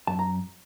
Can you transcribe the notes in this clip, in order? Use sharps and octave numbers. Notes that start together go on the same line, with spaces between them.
F#2 A5
A#5